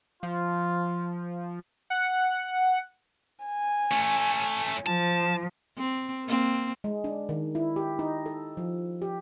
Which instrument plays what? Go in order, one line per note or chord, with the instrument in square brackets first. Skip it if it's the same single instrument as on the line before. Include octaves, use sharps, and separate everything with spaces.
[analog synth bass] F3 [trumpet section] F4
[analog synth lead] F#5
[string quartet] G#5
[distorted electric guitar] A3 C#4
[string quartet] F3 [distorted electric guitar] A5
[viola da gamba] C4
A#3 C4
[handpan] G#3
D4
D#3
E4
G4
D#4
A4
F3
G4